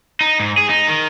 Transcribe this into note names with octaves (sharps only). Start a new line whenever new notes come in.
D#4
G#2
G#4
D#4
D#3